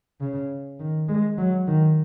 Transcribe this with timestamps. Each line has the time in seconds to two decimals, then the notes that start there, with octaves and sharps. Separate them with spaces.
0.21 C#3
0.79 D#3
1.08 G#3
1.38 F#3
1.67 D#3